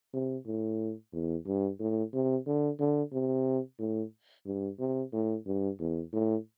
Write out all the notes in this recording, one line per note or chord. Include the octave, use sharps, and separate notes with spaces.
C3
A2
E2
G2
A2
C3
D3
D3
C3
A2
G2
C3
A2
G2
E2
A2